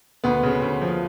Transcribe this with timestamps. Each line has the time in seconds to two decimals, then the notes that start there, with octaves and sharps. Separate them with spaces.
0.24 D2 B3
0.43 C#3
0.62 D2
0.82 F3